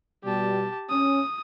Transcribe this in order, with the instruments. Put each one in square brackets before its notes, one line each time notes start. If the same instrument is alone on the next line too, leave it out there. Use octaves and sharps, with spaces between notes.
[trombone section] B2 G3 [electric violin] G4 A5
[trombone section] C#4 [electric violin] D#6